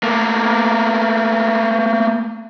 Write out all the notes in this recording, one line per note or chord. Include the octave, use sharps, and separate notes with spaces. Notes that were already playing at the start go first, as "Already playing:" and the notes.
A3 A#3